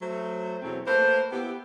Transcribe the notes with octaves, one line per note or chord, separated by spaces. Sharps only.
F#3 A3 C5
E2 B2 F#3 A3 C4 E4
A3 A#3 B4 C5
B3 E4 G4